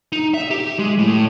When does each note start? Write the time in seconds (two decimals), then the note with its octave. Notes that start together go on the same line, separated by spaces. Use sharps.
0.12 D#4
0.34 E5
0.51 G4
0.79 G#3
0.98 A2